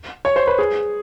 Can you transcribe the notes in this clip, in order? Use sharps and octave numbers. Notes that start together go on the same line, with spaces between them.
C#5
C5
B4
G#4